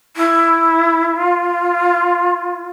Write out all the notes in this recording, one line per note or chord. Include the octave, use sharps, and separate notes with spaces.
E4
F4